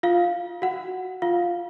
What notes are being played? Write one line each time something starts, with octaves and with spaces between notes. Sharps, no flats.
F4 F5
F#4 F#5
F4 F5